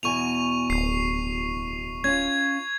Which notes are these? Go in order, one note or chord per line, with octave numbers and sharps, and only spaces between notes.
E2 B2 G#5 C#6 D#7 F7
D1 C7
C#4 F4 G#6